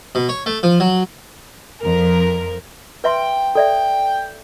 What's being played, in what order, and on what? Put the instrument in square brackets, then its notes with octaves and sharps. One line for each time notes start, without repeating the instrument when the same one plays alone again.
[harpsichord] B2
C#5
A3
F3
F#3
[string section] F2 A#4
[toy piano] B4 E5 C6 [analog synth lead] G5
[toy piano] A4 D5 E5 [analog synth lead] G5